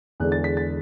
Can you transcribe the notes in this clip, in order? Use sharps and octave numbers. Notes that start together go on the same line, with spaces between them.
E2 D3 G#3 D4 F#6
A6
B6
A6